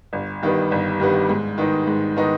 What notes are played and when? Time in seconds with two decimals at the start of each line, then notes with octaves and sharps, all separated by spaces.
0.13 G1
0.42 G2 D#3 G3 B3
0.71 G1
1.00 G2 D#3 G3 B3
1.29 G#2
1.58 D#3 B3 D#4
1.87 G#2
2.16 D#3 B3 D#4